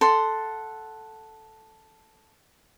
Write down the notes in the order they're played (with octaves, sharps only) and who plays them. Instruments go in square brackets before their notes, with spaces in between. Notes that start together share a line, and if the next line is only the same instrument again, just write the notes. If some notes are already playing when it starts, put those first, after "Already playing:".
[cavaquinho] A4 F#5 C6